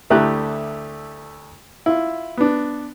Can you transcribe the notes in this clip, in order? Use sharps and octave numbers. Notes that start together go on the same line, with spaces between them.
D2 A3 E4 G4 A#5 F#6
E4 F4
B3 D4